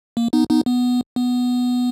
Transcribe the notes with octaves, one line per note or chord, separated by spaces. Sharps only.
A#3
B3 D#4
B3 D#4
B3
B3